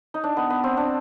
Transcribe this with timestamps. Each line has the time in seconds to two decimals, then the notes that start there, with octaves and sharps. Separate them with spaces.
0.14 D#4
0.24 D4
0.37 B3
0.50 B3
0.64 C4
0.77 D4